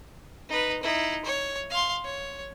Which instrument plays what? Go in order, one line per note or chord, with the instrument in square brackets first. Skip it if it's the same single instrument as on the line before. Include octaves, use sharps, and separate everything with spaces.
[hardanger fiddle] D#4 B4
D#4 E4
C#5
F5 C6
C#5